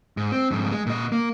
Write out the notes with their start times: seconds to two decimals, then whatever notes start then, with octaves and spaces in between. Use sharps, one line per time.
0.17 G#2
0.32 C4
0.51 F2 G#2
0.72 G#3
0.86 A#2 D#5
1.12 A#3